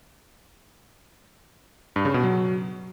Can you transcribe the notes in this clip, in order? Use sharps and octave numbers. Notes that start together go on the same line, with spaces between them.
G2
C#3
B2
F#3